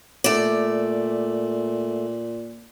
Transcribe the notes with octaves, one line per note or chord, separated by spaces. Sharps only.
A#2 A3 D5